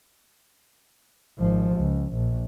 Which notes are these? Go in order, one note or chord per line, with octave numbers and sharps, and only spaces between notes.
G#1 F3
C#2
A#1